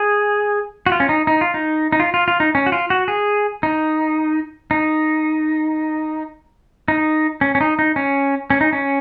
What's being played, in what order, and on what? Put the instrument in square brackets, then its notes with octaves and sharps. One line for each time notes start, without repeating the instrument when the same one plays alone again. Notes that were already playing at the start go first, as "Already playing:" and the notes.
Already playing: [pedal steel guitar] G#4
F#4
F4
C#4
D#4
D#4
F4
D#4
D#4
F4
F4
F4
D#4
C#4
F#4
F4
F#4
G#4
D#4
D#4
D#4
C#4
C#4
D#4
D#4
C#4
C#4
D#4
C#4